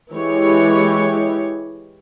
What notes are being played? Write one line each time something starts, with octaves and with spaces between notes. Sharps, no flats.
E3 G#3 G4 C#5